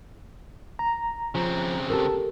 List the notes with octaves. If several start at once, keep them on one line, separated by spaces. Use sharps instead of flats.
A#5
C#3 F3 C4
G4 A4 A#4 A5 E6